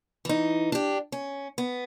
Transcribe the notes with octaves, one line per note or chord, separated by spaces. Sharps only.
E3 D#4
D4 G4
C#4
B3